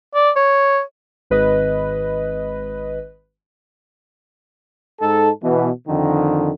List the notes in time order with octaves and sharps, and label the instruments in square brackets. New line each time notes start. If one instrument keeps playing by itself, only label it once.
[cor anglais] D5
C#5
[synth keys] G#1 B4 D#5
[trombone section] G#2 D#4 A4
B2 E3
F2 D3 D#3